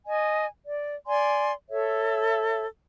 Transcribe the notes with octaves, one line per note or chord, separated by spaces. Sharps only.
D#5 G#5
D5
D5 G#5 C6
A4 C#5 E5